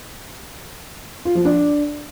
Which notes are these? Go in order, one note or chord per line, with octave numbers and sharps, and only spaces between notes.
F4
F3
D4